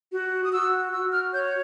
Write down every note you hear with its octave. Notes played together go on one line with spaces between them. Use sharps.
F#4
D#6
F#4 E6
F#4 E6
F6
C#5 G6